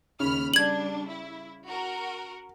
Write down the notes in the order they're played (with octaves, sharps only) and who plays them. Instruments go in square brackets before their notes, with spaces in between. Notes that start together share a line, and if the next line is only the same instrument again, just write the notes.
[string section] D#2 B5 F6 [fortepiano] C#3
[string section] G3 D4 [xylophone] G#6 F#7
[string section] E4
F#4 A#4